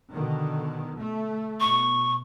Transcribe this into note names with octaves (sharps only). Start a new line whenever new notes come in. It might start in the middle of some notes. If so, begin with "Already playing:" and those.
B2 D3 D#3
A3
B2 C#6